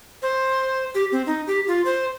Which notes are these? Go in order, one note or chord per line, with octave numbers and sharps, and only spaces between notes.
C5
G4
C4
D#4
G4
F4
C5